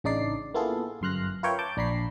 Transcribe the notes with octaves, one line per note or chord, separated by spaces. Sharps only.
A1 C#3 D4 D#4 D5 C7
A#3 B3 E4 F4 G#4 A4
G1 F#2 C6 F6 F#6 A#6
F4 A#4 B4 C#5 E5 G5
A5 D6 G6
A#1 D4 A#5 B5 C#6 C7